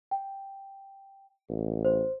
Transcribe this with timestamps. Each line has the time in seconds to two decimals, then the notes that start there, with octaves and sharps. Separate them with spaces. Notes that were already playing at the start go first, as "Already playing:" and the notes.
0.11 G5
1.49 A1
1.85 C5